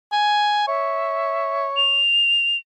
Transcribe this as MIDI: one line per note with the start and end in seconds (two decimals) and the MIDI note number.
0.12 0.65 80
0.67 2.04 73
0.67 1.67 76
1.77 2.57 101